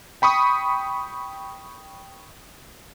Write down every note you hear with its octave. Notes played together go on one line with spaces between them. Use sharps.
G5 B5 C#6 D#6